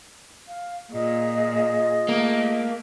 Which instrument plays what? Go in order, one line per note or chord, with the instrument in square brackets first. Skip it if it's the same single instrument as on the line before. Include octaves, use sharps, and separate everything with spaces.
[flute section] F5
[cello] A#2 [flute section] F4 G#4 D#5
[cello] A3 [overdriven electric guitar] A#3